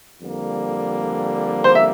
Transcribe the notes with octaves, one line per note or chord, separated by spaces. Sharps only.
F2 D3 G3 A#3
C5
E5